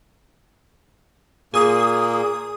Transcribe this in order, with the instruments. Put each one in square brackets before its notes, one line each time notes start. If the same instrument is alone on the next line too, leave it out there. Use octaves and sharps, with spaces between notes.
[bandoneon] A#2 A#3 [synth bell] G#4 D#6